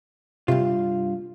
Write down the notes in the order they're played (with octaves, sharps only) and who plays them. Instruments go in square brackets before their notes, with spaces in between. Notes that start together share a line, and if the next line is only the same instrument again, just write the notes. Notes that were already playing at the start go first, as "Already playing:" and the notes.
[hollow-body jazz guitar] G2 F4 [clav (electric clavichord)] C3